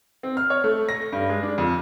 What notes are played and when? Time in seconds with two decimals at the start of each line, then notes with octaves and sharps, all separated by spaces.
0.23 C4
0.37 F6
0.50 C#5
0.64 A3
0.89 A#6
1.12 G2
1.29 G#3
1.43 D4
1.58 F2